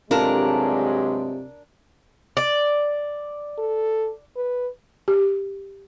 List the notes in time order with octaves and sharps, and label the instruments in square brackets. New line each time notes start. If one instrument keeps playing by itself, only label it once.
[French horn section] G2 F#3 G#3 [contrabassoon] C3 [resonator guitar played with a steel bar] D4 A#4 [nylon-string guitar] F4 A4
[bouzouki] D5
[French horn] A4
B4
[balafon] G4